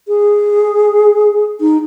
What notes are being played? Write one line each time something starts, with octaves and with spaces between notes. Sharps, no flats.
G#4
D#4